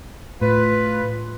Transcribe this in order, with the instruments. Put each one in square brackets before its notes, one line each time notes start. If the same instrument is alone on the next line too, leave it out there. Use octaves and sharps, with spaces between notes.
[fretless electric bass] A2 [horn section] F4 B4